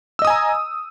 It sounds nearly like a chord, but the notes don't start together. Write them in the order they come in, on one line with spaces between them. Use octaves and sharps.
E6 D#5 D#6 G#5 A#5